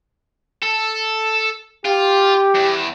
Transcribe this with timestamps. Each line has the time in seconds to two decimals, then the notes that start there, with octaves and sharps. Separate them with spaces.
0.63 A4
1.85 F4 G4
2.55 E2